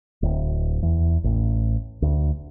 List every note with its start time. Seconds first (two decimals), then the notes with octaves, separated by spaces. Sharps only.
0.22 D1
0.83 E2
1.24 A1
2.02 D2